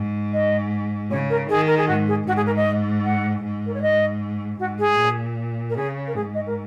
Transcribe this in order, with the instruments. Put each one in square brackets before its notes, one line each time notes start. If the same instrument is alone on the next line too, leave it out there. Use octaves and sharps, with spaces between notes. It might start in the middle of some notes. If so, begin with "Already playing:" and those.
Already playing: [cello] G#2
[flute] D#5
[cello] C#3 [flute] C#5
[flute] A#4
[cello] D#3 [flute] G#4
[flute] A#4
G#4
[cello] G#2 [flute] F#4
[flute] G#4
[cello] G#2 [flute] F#4
[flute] G#4
A#4
D#5
F#5
[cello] G#2
[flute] A#4
C#5
D#5
[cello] G#2 [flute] F#4
[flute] G#4
[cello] A#2
[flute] A#4
[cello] C#3 [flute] G#4
[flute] A#4
[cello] G#2 [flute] G#4
[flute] D#5
A#4